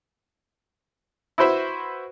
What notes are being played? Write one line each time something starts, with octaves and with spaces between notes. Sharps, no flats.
E4 F#4 B4 C5 E5